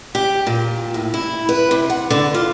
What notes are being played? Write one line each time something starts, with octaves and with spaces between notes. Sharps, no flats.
G4
A#2
A2
E4
B4
C3
F#5
D3
F4